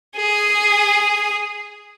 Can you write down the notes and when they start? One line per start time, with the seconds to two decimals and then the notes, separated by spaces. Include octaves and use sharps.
0.16 G#4 D#6